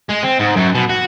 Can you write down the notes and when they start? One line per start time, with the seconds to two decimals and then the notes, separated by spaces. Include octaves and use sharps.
0.10 G#3
0.24 C4
0.40 G#2
0.57 F#2
0.75 B2
0.89 F#4